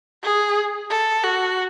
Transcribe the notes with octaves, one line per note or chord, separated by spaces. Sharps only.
G#4
A4
F#4